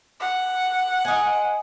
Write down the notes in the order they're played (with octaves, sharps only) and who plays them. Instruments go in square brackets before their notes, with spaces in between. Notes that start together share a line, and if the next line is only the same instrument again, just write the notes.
[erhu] F#5
[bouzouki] D#5 G#5